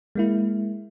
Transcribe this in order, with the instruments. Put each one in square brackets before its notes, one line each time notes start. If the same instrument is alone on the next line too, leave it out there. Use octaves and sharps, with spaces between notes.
[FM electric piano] G#3 A#3 E4